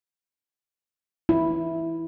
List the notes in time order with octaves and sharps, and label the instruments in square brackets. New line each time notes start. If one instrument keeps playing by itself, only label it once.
[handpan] E4